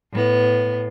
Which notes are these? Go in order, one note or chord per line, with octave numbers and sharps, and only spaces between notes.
A2 B3